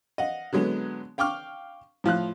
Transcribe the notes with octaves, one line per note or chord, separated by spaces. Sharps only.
D#5 F5 F#5
D3 F#3 G#3 B3
F5 G5 C#6 D6 F6
A2 F3 F5 F#6